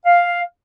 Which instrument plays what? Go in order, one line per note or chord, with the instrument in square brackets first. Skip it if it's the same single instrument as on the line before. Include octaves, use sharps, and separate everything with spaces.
[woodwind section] F5